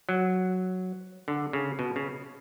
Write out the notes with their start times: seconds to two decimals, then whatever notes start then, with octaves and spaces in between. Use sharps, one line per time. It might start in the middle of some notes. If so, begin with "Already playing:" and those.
0.09 F#3
1.28 D3
1.53 C#3
1.79 B2
1.96 C#3